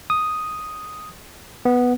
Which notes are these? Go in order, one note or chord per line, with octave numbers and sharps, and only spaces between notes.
D#6
B3